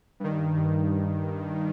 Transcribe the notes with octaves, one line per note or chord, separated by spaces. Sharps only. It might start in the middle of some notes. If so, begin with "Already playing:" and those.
G2 D#3
G2 D#3